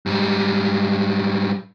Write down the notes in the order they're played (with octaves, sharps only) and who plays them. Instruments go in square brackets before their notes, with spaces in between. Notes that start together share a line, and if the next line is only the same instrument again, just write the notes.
[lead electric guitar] G#2 G3